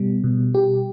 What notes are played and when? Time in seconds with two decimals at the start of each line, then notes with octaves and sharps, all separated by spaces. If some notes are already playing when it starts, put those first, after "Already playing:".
Already playing: B2 G3 B3
0.24 B2
0.55 G4